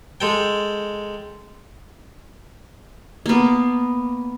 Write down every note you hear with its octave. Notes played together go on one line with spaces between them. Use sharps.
G#3 A4 G5
A#3 B3